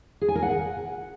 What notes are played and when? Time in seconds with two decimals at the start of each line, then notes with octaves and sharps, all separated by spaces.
0.21 G#4
0.28 G#5
0.35 A#4
0.42 F#5